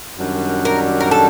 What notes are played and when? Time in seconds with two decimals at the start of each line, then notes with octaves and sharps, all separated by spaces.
0.18 F#2 D#3 G3 D4 F#4
0.65 A#4
1.00 A#4
1.11 A4